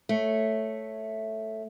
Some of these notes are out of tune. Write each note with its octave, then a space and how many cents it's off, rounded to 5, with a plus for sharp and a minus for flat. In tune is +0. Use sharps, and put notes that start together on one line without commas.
A3 +0 C#5 +0